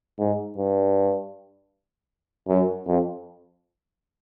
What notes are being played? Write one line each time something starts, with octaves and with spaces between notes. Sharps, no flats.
G#2
G2
F#2
F2